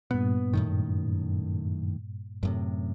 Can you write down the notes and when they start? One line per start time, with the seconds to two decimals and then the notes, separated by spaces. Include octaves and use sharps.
0.11 G2 A#2 B3
0.53 F#2 A2 D#3
2.43 F#2 A2 C3